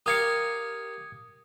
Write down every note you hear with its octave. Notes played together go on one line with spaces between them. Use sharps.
G4 A#4 F5 D#6 G#6 C#7